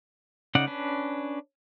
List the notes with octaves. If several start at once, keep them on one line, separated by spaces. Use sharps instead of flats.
C#3 C#4 D#4 D5 F#5
C#4 D4 B4